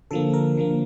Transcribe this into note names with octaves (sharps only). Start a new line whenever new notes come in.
D3 F3 A#3 A4
A#4
D3 F3 A#3